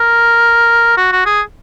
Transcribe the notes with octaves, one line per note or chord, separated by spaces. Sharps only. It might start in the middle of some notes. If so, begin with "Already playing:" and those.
Already playing: A#4
F#4
F#4
G#4